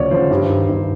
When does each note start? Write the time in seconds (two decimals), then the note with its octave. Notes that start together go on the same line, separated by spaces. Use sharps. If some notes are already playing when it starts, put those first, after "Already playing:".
Already playing: D2 C#3 F3 C#5 D5
0.11 C#3 F3 C5
0.31 G2
0.49 D#3
0.69 G2